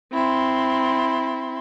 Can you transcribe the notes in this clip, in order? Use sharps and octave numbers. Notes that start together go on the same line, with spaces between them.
C4 E4 C6